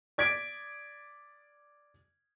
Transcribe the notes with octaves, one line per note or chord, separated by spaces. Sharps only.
D5 G#6 B6 D7